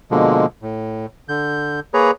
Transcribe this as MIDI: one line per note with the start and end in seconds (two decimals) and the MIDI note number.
0.11 0.46 47
0.11 0.46 50
0.11 0.46 53
0.11 0.46 56
0.11 0.46 58
0.62 1.06 45
1.29 1.80 50
1.29 1.80 91
1.94 2.11 58
1.94 2.11 68
1.94 2.11 71
1.94 2.11 73
1.94 2.11 82